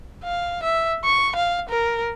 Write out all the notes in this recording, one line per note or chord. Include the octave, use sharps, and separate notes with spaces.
F5
E5
C#6
F5
A#4